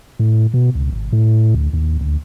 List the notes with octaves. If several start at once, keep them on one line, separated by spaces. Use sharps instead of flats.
A2
B2
C#2
G#1
A2
D2
D#2
D2